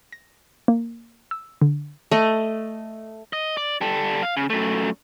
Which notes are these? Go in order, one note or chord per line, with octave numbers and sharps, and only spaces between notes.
A#6
A#3
E6
D3
A3 D#5
D#5
D5
G3 A4
F5
C#3
F#2 A3